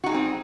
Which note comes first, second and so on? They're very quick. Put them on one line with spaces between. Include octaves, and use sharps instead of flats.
F#4 D#4 G#4 G3 C4